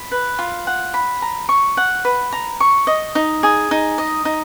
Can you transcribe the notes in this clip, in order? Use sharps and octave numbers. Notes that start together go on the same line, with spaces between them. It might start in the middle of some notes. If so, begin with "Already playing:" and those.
Already playing: B5
B4
F4
F#5
B5
A#5
C#6
F#5
B4
A#5
C#6
D#5
D#4
G#4
D#4
D#5
D#4